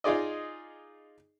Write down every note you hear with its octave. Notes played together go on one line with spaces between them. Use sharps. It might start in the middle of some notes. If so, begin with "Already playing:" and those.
D#4 F4 G#4 D5 D#5